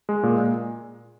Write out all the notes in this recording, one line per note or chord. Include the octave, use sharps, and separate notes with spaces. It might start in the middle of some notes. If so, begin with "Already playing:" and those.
G#3
A#2
A#2